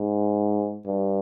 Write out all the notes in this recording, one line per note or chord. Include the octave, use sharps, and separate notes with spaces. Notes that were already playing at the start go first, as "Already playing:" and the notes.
Already playing: G#2
G2